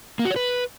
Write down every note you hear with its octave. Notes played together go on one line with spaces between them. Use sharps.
A#3
F#4
C#5
B4